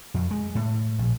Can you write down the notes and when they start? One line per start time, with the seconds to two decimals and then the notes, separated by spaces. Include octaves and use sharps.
0.14 F2
0.31 G#3
0.55 A2
0.98 A#1